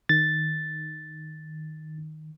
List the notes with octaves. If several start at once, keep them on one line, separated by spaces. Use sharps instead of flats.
D#3 A6